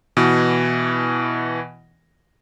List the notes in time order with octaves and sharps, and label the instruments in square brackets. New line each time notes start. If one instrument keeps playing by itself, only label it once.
[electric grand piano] B2 E3